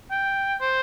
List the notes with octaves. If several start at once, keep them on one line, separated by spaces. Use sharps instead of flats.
G5
C5